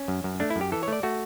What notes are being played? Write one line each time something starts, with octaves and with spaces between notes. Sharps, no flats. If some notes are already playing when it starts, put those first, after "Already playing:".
Already playing: C#4
F#2
F#2
A3 D4
E4
F#2
G4
E3 A4
C#5
A3 D5
A3 F#4